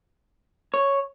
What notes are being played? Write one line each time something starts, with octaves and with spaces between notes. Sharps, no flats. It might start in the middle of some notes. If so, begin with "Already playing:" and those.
C#5